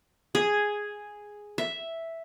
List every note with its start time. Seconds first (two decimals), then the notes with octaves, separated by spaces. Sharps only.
0.35 G#4
1.58 E5